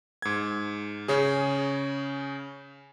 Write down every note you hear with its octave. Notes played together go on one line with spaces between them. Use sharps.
G#2 G#6
C#3 C#4 G#4